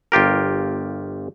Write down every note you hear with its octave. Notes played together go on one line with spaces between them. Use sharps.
G1 F4 G4 A#4